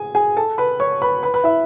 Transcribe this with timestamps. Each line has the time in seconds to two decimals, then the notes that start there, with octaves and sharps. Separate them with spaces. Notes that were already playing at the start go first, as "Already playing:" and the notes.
Already playing: G#4 G#5
0.15 G#4 G#5
0.37 A4 A5
0.58 B4 B5
0.80 C#5 C#6
1.02 B4 B5
1.23 B4 B5
1.34 B4 B5
1.44 E4 E5